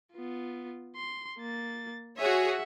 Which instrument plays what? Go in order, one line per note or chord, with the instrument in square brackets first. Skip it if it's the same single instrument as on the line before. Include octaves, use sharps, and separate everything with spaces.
[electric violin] B3 F4
C6
A#3 A6
[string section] F#4 G#4 C#5 [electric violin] E5 F#5